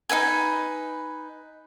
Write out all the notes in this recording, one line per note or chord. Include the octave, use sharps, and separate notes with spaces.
D#4 E4 B4 G#5